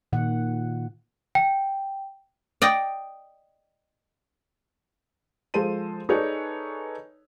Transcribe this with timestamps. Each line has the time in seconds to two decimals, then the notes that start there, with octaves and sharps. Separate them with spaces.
0.13 A#2 D#3 F#5
1.35 G5
2.62 D5 D#5 G5
5.54 F3 G#3 A4 C5 A5 D#7
6.09 D#4 G#4 A4 B4 C#5 D5